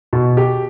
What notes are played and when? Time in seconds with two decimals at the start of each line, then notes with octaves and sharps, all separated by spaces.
0.13 B2
0.37 G4